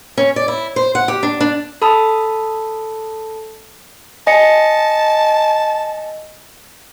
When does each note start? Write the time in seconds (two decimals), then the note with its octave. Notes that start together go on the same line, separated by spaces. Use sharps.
0.18 C#4
0.36 D5
0.48 E4
0.76 C5
0.95 F#5
1.08 G4
1.23 D4
1.41 D4
1.82 A4 A5 B5 D#6 E6
4.27 D#5 G#5 A5 C#7